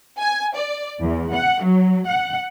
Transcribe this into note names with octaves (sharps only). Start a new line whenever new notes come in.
G#5
D5
E2
F#5
F#3
F#5